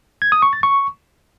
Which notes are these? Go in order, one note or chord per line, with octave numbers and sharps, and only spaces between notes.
G#6
D#6
C#6
A6
C#6